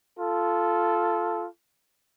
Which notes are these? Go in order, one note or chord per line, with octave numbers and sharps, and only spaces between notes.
F4 A4